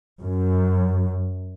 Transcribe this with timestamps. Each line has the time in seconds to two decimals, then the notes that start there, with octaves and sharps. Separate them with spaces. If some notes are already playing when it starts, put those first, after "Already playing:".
0.21 F#2